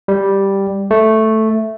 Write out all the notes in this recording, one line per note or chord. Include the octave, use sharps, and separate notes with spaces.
G3
A3